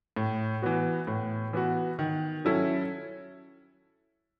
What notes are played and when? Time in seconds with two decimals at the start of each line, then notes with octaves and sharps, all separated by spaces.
0.16 A2
0.62 E3 B3 F#4
1.07 A2
1.53 E3 B3 F#4
1.99 D#3
2.45 F#3 C#4 E4 A4